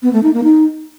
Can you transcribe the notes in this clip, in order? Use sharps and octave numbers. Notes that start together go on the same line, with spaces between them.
B3
A3
D#4
A#3
D#4